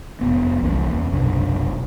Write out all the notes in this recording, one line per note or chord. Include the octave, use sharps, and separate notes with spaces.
F1 F#2 B3
C2 E3 A#3 C#4
D1 E2
F#1 B1 C3 D4